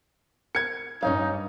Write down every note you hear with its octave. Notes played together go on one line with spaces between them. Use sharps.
A#4 G#6 C#7
G2 G3 C#4 D#4 C#5 F5